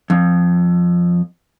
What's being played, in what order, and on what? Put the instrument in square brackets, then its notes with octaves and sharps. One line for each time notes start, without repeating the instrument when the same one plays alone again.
[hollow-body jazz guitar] F2